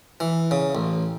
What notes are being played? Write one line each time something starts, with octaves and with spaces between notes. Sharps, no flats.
E3
C#3
A1